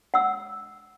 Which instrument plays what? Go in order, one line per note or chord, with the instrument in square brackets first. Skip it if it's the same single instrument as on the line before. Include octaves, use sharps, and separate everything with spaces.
[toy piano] F#5 E6